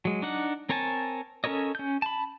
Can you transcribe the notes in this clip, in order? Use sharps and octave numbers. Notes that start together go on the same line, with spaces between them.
F#3 G#3
D4 D#4 F#5
C4 A#4 C#5 G#5 A5
C#4 A4 A#4 C#5 D#5
C#4 G6
A5 B5